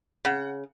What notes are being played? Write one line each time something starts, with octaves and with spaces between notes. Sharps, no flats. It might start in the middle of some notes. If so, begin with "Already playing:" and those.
C#3 F#5